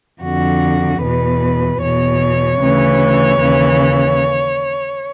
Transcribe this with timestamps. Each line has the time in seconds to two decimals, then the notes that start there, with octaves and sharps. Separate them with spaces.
0.22 F2 D3 F#4
1.01 E2 B2 B4
1.81 E2 B2 C#5
2.61 D2 C#3 E3
3.40 D#2 C#3 E3